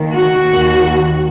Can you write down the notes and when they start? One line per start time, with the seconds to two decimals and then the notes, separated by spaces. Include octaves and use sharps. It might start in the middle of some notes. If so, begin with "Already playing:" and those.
Already playing: D#2 D#3
0.13 F#4
0.50 D#2 D#3